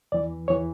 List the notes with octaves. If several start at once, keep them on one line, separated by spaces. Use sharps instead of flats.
E2 E3 D5
E2 E3 C#5